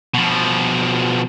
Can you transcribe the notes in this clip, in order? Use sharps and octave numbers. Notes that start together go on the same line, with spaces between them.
B2 F3